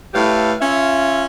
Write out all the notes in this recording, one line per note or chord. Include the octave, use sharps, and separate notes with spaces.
A2 A3 G4 B4 F5
C#4 F4 E5